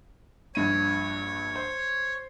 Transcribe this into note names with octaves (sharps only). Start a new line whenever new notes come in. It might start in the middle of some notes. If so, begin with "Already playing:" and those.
A#1 G2 C#5 D#7
C5